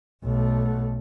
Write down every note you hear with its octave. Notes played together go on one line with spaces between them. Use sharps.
B1 A3